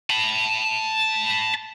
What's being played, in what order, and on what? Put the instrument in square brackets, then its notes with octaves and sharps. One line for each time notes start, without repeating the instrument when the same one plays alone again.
[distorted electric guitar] A5 B5